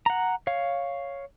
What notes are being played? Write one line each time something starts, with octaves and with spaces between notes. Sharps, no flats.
F#5 A#5
C#5 F5